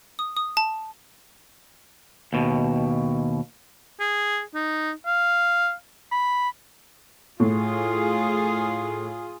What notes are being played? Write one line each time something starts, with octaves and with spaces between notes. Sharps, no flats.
D#6
D#6
A5
D#2 B2
G#4
D#4
F5
B5
A2 F4 G#4